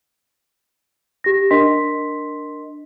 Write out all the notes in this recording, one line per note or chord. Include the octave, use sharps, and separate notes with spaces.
G4 A#6
D4 A#4 D#5 C6 B6